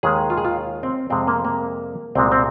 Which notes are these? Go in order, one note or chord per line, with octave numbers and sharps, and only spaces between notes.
D#2 D#3 G#3 G#4
F4
G#4
F4
C4
F2 C3 G#3 C4
A#3
A#3
C2 A#2 G#3 C4
C4